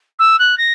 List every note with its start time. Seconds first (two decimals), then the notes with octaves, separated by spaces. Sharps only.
0.19 E6
0.39 F#6
0.58 A#6